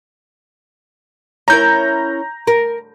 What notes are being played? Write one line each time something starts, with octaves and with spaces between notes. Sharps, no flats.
C#4 E4 A#4 A#5 G6
A#4